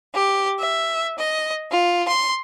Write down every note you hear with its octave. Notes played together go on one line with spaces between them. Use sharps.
G4
E5
D#5
F4
C6